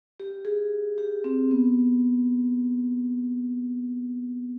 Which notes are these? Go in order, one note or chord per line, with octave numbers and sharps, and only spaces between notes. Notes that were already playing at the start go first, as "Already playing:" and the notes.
G4
G#4
G4
C4
B3